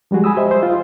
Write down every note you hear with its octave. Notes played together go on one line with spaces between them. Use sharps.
F3 G3 G#3 F#4 G#4
G#5 B5 D#6 E6
G4 C5 D#5 E5
C5
F4